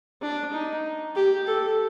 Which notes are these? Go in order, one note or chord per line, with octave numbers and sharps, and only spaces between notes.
D4
D#4
G4
A4